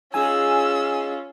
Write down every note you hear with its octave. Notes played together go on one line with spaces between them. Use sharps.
G#3 C#4 D#4 F4 G#4 G#5 E6